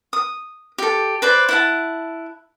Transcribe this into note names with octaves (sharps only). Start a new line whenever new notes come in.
D#6
G4 A4
B4 C5 D5
E4 F#5 A5